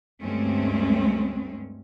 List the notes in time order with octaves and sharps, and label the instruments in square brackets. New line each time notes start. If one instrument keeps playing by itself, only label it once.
[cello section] D2 G2 G#3 A3 C4 C#4